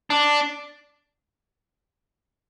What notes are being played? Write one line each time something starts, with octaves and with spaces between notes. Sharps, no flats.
D4